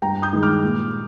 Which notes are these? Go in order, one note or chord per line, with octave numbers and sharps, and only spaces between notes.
G2 G5 A#5
D#6 G6
D#3 G#3
D6 F6
A#2